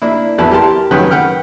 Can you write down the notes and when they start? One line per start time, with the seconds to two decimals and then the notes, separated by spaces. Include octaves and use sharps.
0.02 A#3 D4 E4
0.38 E2 F#3 E4 B4 A5
0.51 G4 A#4 G5 A5 C6
0.91 F#2 D#3 C#4 B4 F#5 G5
1.11 B4 F#5 G5 F6